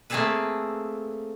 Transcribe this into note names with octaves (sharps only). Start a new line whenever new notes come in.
A3 A#3 C4 G#4 A4 B4